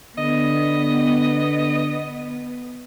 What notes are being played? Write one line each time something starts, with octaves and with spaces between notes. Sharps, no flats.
D3 B3 D#5